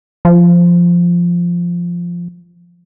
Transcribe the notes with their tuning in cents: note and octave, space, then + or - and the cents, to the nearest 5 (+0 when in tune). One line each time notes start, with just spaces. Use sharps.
F3 -5